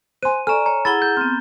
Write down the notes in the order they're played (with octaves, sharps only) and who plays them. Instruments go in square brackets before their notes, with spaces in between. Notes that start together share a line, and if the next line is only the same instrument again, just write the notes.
[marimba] C5 C6 [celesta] G#5 F#6 [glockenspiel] D#7
[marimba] A4 [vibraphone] D5 A#5 [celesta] G#5 C#6 [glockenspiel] F6 E7
[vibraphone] C#5 [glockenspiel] A#5
[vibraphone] E4 G#4 F#5 [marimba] B5 [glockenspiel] A6 G7
[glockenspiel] G6
[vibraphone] B3 C4 [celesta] F6